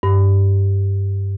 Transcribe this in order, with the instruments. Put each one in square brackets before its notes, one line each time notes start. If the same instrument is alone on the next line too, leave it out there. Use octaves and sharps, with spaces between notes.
[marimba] G2